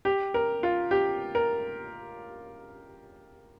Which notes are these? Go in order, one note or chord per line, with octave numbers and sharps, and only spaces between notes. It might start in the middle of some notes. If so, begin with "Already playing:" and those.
G4
A#4
F4
G4
A#4